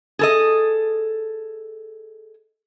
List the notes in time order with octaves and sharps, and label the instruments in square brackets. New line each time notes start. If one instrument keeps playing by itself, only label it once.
[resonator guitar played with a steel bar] G#4 A4 D#5